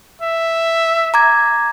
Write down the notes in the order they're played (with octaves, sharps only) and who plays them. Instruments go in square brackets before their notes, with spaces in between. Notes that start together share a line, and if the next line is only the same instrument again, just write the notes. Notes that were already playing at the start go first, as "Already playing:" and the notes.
[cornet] E5
[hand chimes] A#5 D6 G#6